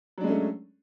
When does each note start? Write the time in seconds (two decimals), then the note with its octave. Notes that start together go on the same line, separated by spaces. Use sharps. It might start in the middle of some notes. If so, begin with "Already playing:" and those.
0.18 F#3
0.21 D4
0.24 G#3
0.27 C#4
0.30 A3